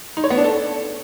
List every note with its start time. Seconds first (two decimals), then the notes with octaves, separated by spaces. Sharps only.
0.17 D#4
0.24 C#5
0.31 B3
0.37 D4
0.44 A4